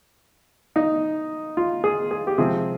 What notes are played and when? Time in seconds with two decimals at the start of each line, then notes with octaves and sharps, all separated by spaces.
0.76 D#4
1.57 F4
1.84 G#4
2.11 G#4
2.27 G4
2.38 C3 F3 G#3 C4 G#4